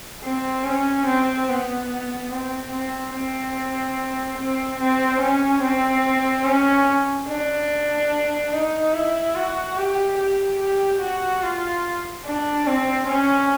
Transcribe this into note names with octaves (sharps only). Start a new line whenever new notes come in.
C4
C#4
C4
B3
C4
C4
C4
C4
C4
C#4
C4
C#4
D4
D#4
E4
F#4
G4
G4
G4
F#4
F4
D4
C4
C#4